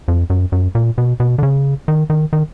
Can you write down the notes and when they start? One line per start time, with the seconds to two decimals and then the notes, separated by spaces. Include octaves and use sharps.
0.08 F2
0.30 F#2
0.52 F#2
0.75 A#2
0.98 B2
1.20 B2
1.38 D3
1.43 C#3
1.88 D#3
2.10 D#3
2.33 D#3